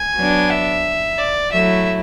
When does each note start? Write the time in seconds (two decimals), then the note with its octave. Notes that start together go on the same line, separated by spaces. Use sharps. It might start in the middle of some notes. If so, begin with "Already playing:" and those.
Already playing: G#5
0.16 F#3 B3 D4
0.50 E5
1.18 D5
1.52 F#3 A3 E4 E5